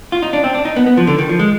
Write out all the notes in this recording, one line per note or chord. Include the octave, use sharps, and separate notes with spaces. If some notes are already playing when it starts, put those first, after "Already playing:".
F4
D#4
D4
C4
D4
D#4
B3
B3
F3
D3
D#3
F3
G#3